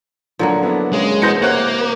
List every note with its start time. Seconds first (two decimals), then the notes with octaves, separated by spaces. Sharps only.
0.39 D3 F3 F#3 A#3
0.63 B3 D4 E4
0.93 C#3 G#3
1.22 B2 E3 C5 G6 A#6 C#7
1.42 C3 A#3 C#5 F#5 F#6